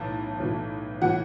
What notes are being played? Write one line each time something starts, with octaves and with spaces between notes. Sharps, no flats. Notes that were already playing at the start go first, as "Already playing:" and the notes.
Already playing: B1 A2 E3 A5
B1 A2 E3
A2 E3 F#5